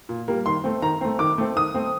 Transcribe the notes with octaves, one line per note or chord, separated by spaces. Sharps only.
A#2
G3 A#3
D#3 C6
A3 C4
D#3 A#5
A3 C4
D#3 D6
A3 C4
D#3 D#6
A3 C4